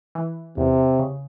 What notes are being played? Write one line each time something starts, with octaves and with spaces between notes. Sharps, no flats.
E3
E2 C3
C#3